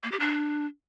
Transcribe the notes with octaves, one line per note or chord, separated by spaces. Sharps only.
A#3
G4
D4